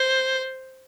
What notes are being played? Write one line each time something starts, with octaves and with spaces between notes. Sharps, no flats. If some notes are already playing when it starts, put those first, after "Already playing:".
Already playing: C5